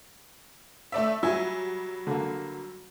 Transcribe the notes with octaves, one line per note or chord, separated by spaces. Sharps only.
A3 D5 E5
F#3 G3 E5 G#5
D3 A#3